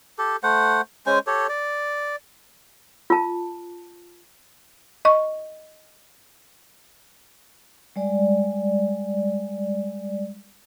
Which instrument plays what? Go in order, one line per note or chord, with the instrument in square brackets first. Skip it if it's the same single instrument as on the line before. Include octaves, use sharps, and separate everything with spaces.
[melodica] G4 A4
A3 C5 F#5
G#3 C#4 C5 G#5
G4 A4 C#5
D5
[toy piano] F4 A5
[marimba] D#5 C#6
[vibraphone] G3 G#3 D5